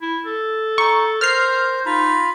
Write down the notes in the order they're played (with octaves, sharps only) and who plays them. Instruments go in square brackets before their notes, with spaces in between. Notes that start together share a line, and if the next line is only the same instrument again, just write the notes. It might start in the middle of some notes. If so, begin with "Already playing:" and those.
[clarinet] E4
A4
[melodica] D#4 [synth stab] C#6
[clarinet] A#4 [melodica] C5 [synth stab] F6 C7
[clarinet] D#4 [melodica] F4 B5